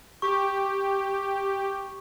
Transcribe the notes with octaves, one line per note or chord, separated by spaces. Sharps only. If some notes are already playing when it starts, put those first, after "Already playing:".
G4 C#6